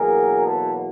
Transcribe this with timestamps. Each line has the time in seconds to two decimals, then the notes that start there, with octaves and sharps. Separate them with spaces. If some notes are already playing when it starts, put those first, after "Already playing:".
Already playing: E2 B2 F#3 A#3 G#4 A#4
0.46 A4 B4